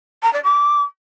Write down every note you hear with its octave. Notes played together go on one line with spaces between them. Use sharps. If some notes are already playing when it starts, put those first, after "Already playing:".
A#5
D5
D6